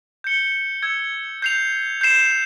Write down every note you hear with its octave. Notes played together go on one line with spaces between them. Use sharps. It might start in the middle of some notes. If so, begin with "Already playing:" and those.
G6 C#7 G7
E6 G#6 C#7
G6 C7 F7
G6 C7 E7